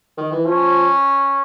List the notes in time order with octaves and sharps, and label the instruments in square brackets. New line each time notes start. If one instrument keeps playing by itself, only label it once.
[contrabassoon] D#3
E3
[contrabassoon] F3 [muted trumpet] C#4